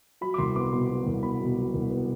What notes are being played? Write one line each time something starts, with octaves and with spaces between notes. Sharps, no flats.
F#3 B5
D6
C2 C6
B3 D6
B2 C6
F#3
C2
B3 B5
B2
F#3
C2
B3